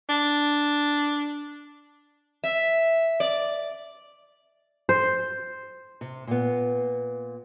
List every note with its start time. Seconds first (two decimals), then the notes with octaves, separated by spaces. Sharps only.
0.09 D4
2.44 E5
3.20 D5
4.89 C5
6.01 C3
6.27 A#2 B3